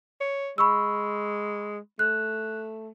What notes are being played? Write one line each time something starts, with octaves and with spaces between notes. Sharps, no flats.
C#5
G#3 B5 C#6 E6
A3 F#6